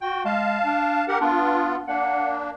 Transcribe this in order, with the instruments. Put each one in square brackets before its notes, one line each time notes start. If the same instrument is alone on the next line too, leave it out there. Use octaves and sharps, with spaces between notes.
[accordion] F#4 [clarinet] G5
[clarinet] G#3 [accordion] F5 A5
[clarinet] D4
[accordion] G4 A#4 F#5
[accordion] B3 F4 [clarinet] D4
[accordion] A#3 D4 [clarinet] F#5